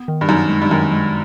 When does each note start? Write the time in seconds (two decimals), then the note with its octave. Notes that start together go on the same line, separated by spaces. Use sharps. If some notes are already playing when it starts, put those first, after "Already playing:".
Already playing: B3
0.08 D#3
0.21 G2
0.28 F#2 D#4
0.50 G#3
0.62 G2
0.71 F#2 D#3
0.93 G#3